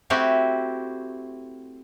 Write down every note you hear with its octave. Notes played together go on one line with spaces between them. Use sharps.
A3 C4 E4 F#4 G4